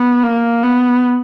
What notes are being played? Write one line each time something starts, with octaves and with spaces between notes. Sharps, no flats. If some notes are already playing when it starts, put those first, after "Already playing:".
Already playing: B3
A#3
B3